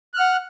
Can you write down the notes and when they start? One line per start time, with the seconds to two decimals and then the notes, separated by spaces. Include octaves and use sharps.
0.14 F#6
0.17 F6
0.19 F#5